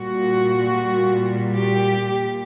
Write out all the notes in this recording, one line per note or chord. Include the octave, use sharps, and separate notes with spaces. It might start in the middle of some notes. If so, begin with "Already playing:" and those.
Already playing: A#2 G3 F#4
G4